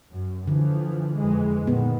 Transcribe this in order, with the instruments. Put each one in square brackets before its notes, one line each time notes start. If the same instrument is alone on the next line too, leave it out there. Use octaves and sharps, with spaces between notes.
[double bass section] F#2
[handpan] D3 [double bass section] E3 F3
[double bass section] F2 E3 G#3
[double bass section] A#2 D#3 [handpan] B3